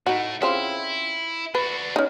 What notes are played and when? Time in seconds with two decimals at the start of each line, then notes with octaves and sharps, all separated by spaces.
0.07 A2 A3 D#4 F#4
0.42 C#3 C4 E4 F4
1.55 D4 F#4 B4
1.96 C#4 D#4